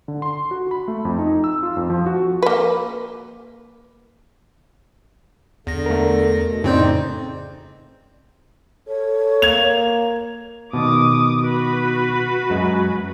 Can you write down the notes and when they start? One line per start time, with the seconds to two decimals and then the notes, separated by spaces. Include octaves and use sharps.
0.08 D3
0.22 C6
0.51 F#4
0.71 B5
0.88 A3
1.05 F2
1.19 D#4
1.44 E6
1.63 F4
1.77 F2
1.90 F3
2.06 F#4
2.42 A#3 B4
5.67 E2 D3 A#6
5.86 A3 A#4
6.43 B2
6.64 F2 A2 C#3 C4 D#4 C5 D5 G6
8.87 A4 C#5
9.42 A#3 G#6 F7
10.73 B2 D#3 D6 D#6
11.42 F#4 B4
12.50 F#2 G#3